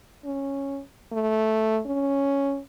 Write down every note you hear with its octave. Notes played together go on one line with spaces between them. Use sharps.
C#4
A3
C#4